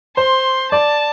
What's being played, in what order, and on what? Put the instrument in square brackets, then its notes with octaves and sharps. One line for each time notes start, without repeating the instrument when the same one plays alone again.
[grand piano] C5 [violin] C6
[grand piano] D5 [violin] A5